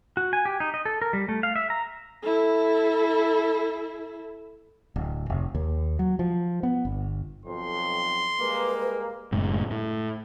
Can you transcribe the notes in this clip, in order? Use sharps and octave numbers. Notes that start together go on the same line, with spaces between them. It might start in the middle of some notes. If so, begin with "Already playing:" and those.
F#4
G#5
G4
D#4
D#5
A4
A#4
G3
A3
F5
E5
A#5
E4 A4
D1
F1
D#2
F#3
F3
B3
G1
B1 F2 C6
G3 G#3 A#3 B4
F#1 F#2 A2 G#3
A2